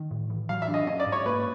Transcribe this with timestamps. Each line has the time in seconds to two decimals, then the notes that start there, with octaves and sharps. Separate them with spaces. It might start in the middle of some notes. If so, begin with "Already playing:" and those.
Already playing: D#3
0.11 A2
0.30 E3
0.49 F#3 F5
0.62 E5
0.68 D4
0.74 D#5
0.87 C#4 D#5
1.00 D5
1.06 G#2
1.12 C#5
1.26 A#3 B4